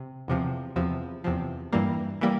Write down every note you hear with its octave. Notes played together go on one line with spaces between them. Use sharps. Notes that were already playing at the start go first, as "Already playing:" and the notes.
Already playing: C3
E2 C3 F3
E2 C3 F3
E2 C3 F3
G2 E3 G3 A#3
E3 G3 A#3